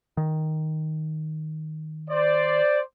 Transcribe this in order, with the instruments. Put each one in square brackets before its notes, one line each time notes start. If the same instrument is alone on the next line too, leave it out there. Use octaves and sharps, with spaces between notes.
[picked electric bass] D#3
[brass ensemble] C5 D5